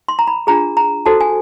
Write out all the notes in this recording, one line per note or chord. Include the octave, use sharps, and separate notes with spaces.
C6
A#5
B5
D4 F4 G#4 A#5
A#5
F#4 A4 C5 A5
G#5